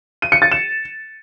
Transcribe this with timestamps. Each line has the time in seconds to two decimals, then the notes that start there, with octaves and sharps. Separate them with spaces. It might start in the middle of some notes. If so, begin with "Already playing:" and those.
0.22 D#7
0.32 C#7
0.42 A6
0.52 E7